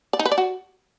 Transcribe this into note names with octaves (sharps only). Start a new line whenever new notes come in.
D5
D#4
B4
D5
F#4